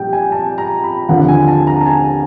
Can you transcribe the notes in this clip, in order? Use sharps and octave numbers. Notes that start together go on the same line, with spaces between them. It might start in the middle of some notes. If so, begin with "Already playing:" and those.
Already playing: A#1 A#2 G3 G5
G#5
A5
A#5
B5
D#2 D3 F3 F#5
G#5
A5
A#5
A5
G#5